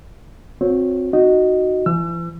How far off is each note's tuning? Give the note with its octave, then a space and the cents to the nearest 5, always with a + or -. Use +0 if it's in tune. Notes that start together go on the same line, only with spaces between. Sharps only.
C4 +0 F#4 -40 C#5 +0
D#4 +0 F#4 +0 D#5 +0
E3 +40 E6 +35